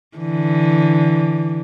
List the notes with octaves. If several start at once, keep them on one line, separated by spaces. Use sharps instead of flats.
D3 E3